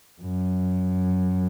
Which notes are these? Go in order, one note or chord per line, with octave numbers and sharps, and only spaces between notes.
F#2